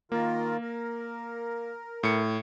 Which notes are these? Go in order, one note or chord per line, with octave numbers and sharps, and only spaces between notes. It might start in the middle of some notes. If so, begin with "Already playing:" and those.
D#3 A#3 F4 A#4
A#4
A2 C#7